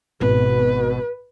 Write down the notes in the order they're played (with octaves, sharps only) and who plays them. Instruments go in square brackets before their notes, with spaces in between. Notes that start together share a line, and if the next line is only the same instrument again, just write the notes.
[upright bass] G#1 [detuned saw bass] B2 [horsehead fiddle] B4